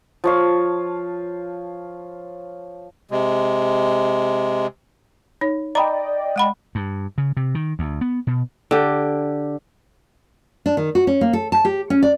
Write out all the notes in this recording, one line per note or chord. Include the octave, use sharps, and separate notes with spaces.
F3 C#5 F5
C3 G#3
D#4 C#5
D5 D#5 G5 A#5 B5
G#3 F#5 B5
G2
C#3
C3
D#3
D2
B3
B2
D3 G4
D4
D#3
F#4
C#4
A#3
A4
A5
G4
C#4
D5